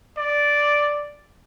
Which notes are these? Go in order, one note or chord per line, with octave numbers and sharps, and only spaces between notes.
D5